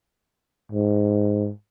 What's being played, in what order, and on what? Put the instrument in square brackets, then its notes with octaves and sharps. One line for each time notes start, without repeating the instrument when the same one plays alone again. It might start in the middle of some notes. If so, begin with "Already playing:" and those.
[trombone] G#2